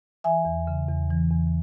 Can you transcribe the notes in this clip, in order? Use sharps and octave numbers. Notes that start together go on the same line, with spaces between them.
E3 E5 G#5
E2
C#3
E2
E3
E2